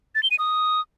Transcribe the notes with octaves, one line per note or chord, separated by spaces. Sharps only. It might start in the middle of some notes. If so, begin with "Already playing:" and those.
A6
G7
D#7
D#6